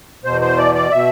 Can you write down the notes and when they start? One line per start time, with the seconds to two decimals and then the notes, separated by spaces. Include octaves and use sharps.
0.24 E2 B2 C5
0.41 C5
0.58 D5
0.75 D5
0.91 B2 E5